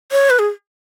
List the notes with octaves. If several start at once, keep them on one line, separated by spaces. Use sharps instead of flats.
C#5
B4
G#4